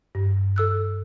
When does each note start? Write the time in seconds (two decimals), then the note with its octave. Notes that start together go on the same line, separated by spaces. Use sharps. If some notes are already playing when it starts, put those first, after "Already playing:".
0.15 G2
0.56 A4 E6 F#6